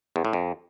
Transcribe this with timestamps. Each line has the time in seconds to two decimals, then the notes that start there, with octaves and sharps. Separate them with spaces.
0.16 E2
0.25 A2
0.33 F2